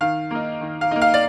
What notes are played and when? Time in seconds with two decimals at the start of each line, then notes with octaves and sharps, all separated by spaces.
0.01 D#3 F5
0.31 A#3 D#4
0.61 D#3
0.81 F5
0.91 A#3 D#4
1.01 F5
1.14 D5